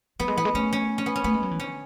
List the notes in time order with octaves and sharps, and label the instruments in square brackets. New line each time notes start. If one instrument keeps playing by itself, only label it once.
[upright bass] F#3 [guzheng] B3
[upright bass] G#3
[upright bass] E3 [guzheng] B3
[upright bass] G#3
[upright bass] A3 [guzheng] C#4
[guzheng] C#4
C#4
B3
C#4
[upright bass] A3 [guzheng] B3
[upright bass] G#3
F#3
E3
[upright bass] D3 [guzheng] C#4